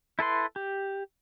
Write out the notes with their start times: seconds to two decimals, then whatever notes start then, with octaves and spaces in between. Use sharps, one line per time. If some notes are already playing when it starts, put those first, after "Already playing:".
0.19 E4 A4 B4 C6
0.56 G4